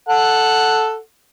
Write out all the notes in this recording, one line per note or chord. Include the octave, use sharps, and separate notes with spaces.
A4 F#5